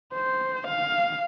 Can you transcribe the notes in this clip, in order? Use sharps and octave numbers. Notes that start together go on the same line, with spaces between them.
C5
F5